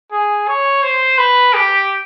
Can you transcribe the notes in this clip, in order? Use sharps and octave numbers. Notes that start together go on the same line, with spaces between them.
G#4
C#5
C5
B4
G4